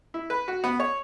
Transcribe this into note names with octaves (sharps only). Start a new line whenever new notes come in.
E4
B4
F#4
B3
C#5